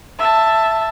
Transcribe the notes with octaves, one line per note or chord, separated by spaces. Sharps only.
E5 A5